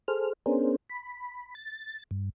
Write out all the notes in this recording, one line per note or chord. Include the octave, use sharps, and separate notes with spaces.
G#4 A4 C5 F6
B3 C#4 D4 G#4 A#4 C5
B5
A6
G2